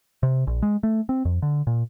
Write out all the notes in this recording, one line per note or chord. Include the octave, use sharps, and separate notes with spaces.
C3
A#1
G#3
A3
C4
F2
D3
A#2